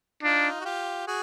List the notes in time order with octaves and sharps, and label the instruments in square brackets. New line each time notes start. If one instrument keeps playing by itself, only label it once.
[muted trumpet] D4 [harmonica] D#4 F4
[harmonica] F#4
F4 G4
F#4 G#4